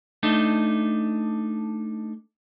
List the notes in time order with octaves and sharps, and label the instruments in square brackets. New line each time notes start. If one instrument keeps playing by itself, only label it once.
[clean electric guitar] A3 D4 D#4